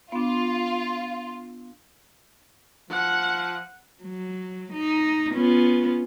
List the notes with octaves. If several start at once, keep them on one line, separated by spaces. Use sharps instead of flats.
B3 D4 F4
F3 F#5
F#3
D#4
B3 C#4 F4